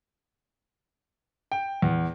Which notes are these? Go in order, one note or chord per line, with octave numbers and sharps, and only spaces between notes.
G5
E2